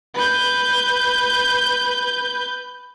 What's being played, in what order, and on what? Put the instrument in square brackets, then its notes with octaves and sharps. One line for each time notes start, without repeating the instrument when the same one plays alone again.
[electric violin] B4 G6